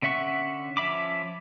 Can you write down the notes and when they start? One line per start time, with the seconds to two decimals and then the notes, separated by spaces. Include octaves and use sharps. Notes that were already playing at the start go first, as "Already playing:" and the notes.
0.02 D3 C#4 E5 F#5 C#6
0.77 F3 C#4 E5 B5 D6